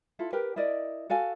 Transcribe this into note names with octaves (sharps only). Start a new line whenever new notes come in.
E4 F4 A4
G4 A#4 B4 G5
E4 A#4 D5 D#5
F#4 A4 F5 G#5